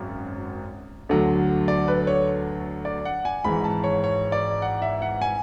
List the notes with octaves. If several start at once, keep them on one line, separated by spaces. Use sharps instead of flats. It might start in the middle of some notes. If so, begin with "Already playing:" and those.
Already playing: G#1 F#2
D2 D3 F#3
D5
B4
C#5
D5
F#5
G#5
G#1 G#2 E3 B5
A5
C#5
C#5
D5
F#5
E5
F#5
G#5